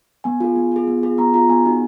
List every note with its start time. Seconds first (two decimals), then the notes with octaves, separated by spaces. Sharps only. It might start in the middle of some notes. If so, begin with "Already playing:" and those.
0.24 B3 G#5
0.40 F4 G#4
0.56 B3
0.72 F4 G#4
0.87 B3
1.03 F4 G#4
1.18 B3 A#5
1.34 F4 G#4 A#5
1.49 B3 G#5
1.65 D#4 F#4